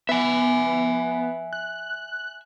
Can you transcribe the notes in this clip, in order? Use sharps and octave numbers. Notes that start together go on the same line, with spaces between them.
B3 E5 G#5
F#6